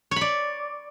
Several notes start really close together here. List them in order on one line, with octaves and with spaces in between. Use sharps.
C#5 B5 D5